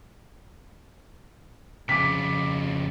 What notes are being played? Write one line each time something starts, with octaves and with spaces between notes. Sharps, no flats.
F2 C#3 D6 B6